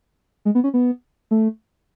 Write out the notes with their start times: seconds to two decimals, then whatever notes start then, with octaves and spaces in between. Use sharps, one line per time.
0.45 G#3
0.55 B3
0.64 C#4
0.74 B3
1.31 A3